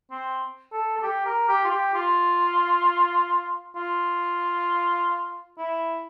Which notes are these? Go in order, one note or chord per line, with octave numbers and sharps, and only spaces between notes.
C4
A4
A4
G4
A#4
G4
F4
G4
F4
F4
E4